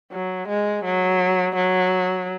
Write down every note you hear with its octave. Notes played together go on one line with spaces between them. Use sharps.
F#3
G#3
F#3
F#3